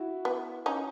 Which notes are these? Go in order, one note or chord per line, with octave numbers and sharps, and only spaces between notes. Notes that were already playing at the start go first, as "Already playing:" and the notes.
Already playing: E4 F#4
B3
C#4 D#4